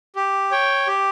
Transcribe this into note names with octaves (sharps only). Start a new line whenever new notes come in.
G4
C#5 G5
G4